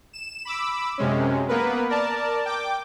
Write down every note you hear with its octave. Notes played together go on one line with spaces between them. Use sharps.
E7
B5 D6 E6
F#2 C3 G#3 C#4
A#3 B3 A#4 B4
A#4 D5 A5
G5 D6